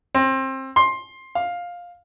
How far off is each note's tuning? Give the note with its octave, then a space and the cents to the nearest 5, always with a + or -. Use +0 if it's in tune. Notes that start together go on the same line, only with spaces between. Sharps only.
C4 +25
C6 +15
F5 +10